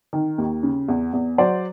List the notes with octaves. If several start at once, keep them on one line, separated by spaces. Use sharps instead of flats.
D#3
D#2
C#3
E2
E2
F#3 C5 D5